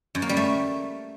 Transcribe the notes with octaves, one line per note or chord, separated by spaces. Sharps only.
F#2
A#3
G3
A3